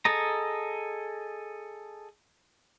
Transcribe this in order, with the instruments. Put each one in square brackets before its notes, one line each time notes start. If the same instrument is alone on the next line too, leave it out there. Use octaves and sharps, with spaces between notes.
[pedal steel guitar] G#4 A4 D#5 A#5